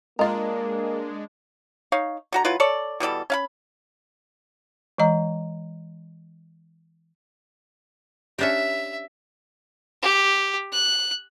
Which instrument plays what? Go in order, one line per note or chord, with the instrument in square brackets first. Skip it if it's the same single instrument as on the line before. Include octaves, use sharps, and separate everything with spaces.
[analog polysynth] G#3 D4 [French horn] A#3 [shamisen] F4 A#4 [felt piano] D#5
[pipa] D#4 C#5 F5
D3 F#4 A#5
F#3 E4 F4 B4
A4 C#5 D5
B2 E3 G3 A4
C#4 F5 B5
[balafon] E3 G#3 D#5 A#5
[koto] C#4 D4 G4 [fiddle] E5
[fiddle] G4
F#6